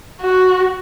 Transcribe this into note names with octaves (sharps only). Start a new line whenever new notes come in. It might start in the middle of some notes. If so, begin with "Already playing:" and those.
F#4